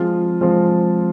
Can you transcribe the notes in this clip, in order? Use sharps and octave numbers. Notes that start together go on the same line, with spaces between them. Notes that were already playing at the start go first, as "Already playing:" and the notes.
Already playing: F3 G#3 C4 F4
F3 G#3 C4 F4